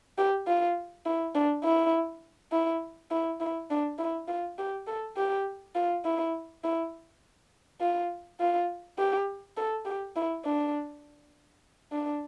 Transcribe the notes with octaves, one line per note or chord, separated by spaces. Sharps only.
G4
F4
E4
D4
E4
E4
E4
E4
D4
E4
F4
G4
A4
G4
F4
E4
E4
F4
F4
G4
A4
G4
E4
D4
D4